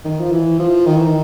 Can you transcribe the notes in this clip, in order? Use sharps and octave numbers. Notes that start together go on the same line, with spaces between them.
D#3
F3
E3
F3
D#3
E3
D#3